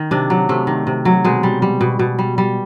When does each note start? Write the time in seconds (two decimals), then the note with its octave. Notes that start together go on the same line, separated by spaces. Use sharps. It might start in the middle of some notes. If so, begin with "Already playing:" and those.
Already playing: D#3
0.11 C3 D4
0.30 F#3
0.49 C3 A3
0.67 D#3
0.87 C3
1.05 F#3
1.24 B2 G#3
1.43 G3
1.62 G3
1.81 B2
1.99 B2
2.19 G3
2.38 G3